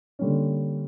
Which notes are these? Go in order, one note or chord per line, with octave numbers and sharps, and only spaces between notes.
D3 G3 A#3 C#4